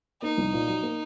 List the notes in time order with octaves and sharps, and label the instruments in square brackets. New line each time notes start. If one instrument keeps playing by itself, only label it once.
[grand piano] A#3 [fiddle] D#4
[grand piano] C2
A#2
F#3
A#3